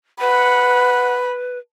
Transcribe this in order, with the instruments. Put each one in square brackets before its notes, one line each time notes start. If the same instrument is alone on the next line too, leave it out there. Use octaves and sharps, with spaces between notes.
[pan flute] B4 [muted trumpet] F#5 [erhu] B5